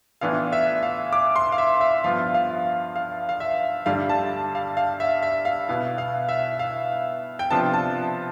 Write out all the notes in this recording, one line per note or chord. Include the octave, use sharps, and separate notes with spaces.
A2 E3 B3 D4 F4 F5
E5
F5
D6
C6
F5
E5
E5
G2 F3 B3 F4 F5
F5
F5
F5
E5
G2 D3 G3 F5
A5
F5
F5
E5
E5
F5
B2 B3 E4 F5
F5
E5
F5
G5
C3 F3 B3 D4 F4 A5
A5